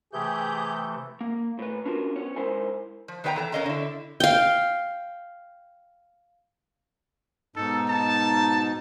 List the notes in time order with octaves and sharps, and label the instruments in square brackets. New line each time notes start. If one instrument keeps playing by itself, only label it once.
[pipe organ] C3 E3 A3 [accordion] G4 G6 [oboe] G#4
[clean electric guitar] A#3
A2 B4
C#4 D4 F4 F#4 A#4
B3 C#4 C#5
G#2 E4 A#4 C5 G#5
[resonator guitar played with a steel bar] F3
D#3 B3 B4 C#5 G5 A#5
E3 A4 A#5
E2 C#4 A#4 D#5 F5 A#5
D3 E4
[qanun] F5 G5
[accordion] G#2 B2 D#4 [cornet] A4
[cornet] A5